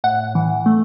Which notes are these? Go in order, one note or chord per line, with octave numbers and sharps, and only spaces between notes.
A2 F#5
E3
A3